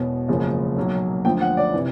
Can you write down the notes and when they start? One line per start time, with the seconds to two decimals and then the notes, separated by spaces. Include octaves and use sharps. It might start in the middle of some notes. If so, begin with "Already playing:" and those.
Already playing: E1 E2 B2
0.28 F#1 F#2 C#3 F3 G#3
0.77 B1 A#2 F#3 A#3
1.25 D2 D3 F3 A#3 G5
1.41 F#5
1.57 D5
1.74 C3 E3